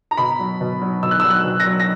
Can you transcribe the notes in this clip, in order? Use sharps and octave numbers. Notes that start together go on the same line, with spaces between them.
A#5
B2 B5
F#3
B2
F#3
B2 E6
F#6
F#3 E6
F#6
B2
A#6
F#3
A#6